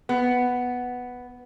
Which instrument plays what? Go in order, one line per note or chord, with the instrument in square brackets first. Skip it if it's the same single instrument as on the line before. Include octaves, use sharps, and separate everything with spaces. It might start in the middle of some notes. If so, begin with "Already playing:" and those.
[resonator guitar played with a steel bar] B3